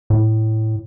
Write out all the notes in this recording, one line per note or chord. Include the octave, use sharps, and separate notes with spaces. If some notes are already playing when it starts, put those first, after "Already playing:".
A2